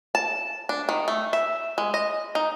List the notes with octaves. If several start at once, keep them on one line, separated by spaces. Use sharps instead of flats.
A5
D4
D#3
A3
E5
G#3
D#5
D#4